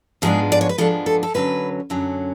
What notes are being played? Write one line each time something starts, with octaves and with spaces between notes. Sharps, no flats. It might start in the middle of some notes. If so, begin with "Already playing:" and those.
G#2 F3 G#3 B3 D4 G#4
D5
C#5
B4
G#2 F3 G#3 B3 D4 A4
A4
A4
F#2 D3 F#3 C#4 B4
F#2 D3 F#3 C#4